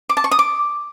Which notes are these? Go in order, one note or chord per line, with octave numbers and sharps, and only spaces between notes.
D6
A5
C#6
D#6
D6